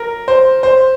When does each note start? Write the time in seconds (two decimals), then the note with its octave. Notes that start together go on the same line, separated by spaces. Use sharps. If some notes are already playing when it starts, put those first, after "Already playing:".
Already playing: A#4
0.28 C5
0.63 C5